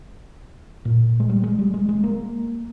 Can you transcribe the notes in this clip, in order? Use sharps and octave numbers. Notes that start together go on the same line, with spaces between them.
A#2
G#3
G3
G#3
G3
G#3
G#3
A#3